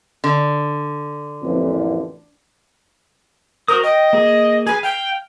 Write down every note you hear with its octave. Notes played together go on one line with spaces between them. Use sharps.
D3
A1 F2 A#2
F#4 A#4 C5 D#6
D#5 G5
A#3 G#4
G#4 B4 G#5
F5 G5